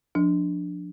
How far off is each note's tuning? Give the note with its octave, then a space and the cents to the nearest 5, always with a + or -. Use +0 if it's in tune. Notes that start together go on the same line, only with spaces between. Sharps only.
F3 +15 D4 +0